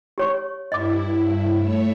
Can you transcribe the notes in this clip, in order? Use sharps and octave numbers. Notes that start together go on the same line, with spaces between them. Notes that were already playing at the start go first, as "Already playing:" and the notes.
G4 C#5 C#6
G2 E4 D#5 D6
A3 C#5 E5